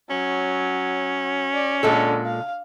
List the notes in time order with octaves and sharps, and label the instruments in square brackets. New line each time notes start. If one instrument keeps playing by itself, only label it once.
[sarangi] F#3 [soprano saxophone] C#4
[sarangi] D5
[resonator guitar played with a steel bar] A#2 G#3 A4 [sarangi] D3
[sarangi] F5